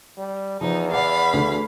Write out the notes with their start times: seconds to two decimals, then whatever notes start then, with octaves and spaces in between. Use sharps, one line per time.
0.18 G3
0.61 E2 F3 D#4
0.92 D5 F5 F#5 B5
1.33 D2 D3